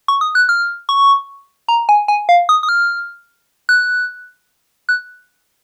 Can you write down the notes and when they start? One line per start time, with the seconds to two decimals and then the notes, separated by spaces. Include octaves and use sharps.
0.08 C#6
0.21 D#6
0.35 F#6
0.49 F6
0.89 C#6
1.69 A#5
1.89 G#5
2.08 G#5
2.29 F5
2.49 D#6
2.63 D#6
2.69 F6
3.69 F#6
4.89 F#6